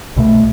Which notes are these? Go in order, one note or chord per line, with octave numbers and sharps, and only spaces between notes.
C2 B2 F#3 A3